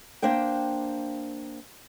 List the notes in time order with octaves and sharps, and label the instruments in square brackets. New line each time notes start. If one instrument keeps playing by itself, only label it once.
[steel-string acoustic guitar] A#3 D4 C5 G5